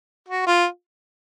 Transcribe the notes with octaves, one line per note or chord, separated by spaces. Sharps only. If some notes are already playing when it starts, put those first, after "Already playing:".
F#4
F4